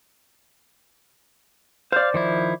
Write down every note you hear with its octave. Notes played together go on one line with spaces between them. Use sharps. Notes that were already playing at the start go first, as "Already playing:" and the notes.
C5 D5 F5
D#3 F3 E4